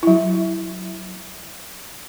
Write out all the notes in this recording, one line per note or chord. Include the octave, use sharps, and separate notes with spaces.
F#3 E4